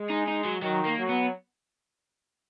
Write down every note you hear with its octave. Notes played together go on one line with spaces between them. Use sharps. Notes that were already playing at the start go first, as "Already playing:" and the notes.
Already playing: G#3
D#4
D#4
F#3
D#3 F#3
A#3
F#3
B3